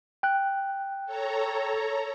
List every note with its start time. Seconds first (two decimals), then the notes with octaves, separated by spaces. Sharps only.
0.23 G5 F#6
1.06 A4 C#5 A#5